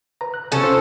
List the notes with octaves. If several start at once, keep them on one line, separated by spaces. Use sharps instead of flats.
B4 A#5
F#6
C3 C#4 A4 G#5
F4 C5 G6